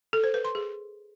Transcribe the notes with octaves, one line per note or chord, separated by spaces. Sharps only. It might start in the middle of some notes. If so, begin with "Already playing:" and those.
A4
C5
B4
C6
G#4